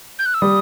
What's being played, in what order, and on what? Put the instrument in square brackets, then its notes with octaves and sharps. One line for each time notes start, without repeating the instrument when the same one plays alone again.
[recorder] G6
F#6
E6
[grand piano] G3 [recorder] D#6